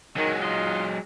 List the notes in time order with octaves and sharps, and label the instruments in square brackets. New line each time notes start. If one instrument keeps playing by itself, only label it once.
[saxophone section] D#3 [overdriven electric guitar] F#3 G#3
[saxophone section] D#4 F4